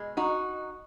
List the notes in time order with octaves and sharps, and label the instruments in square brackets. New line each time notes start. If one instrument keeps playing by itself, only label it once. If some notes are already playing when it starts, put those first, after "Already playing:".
Already playing: [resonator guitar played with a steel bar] B2 G#3
D#4 F#4